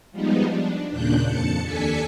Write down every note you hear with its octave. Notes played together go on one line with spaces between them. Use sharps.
F3 G3 G#3 B3 D#4
D4
D#2 A#2 C#3 D4 F#6 G6
F2 A5 C#7
D#2 D4 A4 G#5 B6 C#7